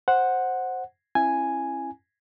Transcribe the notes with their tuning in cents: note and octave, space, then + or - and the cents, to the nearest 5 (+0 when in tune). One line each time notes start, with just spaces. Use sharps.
C5 +5 F#5 -5
C#4 -45 E4 +20 G#5 +0